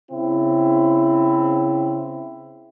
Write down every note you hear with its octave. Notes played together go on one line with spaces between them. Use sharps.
C#3 C4 E4